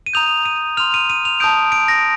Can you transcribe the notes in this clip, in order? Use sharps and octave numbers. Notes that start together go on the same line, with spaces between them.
D#7
A#5 D#6 G6 F7
D#7
C6 F6 F7
D#7
D#7
F7
A5 D#6 G6 D7
D7
A#6